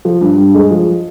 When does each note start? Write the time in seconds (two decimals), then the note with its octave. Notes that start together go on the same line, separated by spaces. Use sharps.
0.05 F3
0.21 G2
0.38 G2
0.54 G#3
0.71 F3